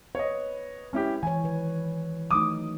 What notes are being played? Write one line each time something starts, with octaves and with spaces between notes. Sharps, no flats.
B4 C#5 D#5
G#3 C#4 E4 G4
E3 C#5 G#5
D#3 B4
F#3 A3 D#4 D6 D#6